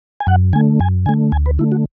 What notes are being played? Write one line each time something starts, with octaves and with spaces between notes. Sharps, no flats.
G#5
F#2 F#5
D3 A3 G#5
F#2 G#5
D3 A3 G#5
D2 G#5
B4
D3 A3 E4
F#4